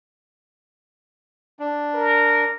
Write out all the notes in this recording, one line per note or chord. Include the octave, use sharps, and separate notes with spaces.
D4
A#4